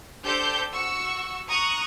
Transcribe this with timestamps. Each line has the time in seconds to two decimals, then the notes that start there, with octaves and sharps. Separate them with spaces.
0.24 D4 G4 A4 C5 G6
0.73 F#4 C#6 E6
1.49 A#5 C#6 D#6 F#6